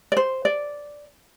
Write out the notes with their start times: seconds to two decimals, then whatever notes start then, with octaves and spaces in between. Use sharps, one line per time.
0.12 D5
0.17 C5
0.45 D5